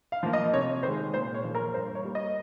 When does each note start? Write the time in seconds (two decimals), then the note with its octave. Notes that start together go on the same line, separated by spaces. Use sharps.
0.12 F5
0.23 F3 A#3
0.33 D#5
0.53 C3 C#5
0.83 D#3 G#3 C5
1.14 A#2 C5
1.34 C#5
1.44 F3 A#3
1.55 A#4
1.74 G2 C5
1.95 C#5
2.05 G3 A#3
2.15 D#5